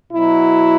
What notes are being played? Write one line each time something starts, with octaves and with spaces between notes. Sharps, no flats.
B2 F#3 E4